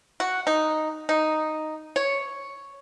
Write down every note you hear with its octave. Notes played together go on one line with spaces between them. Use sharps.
F#4
D#4
D#4
C#5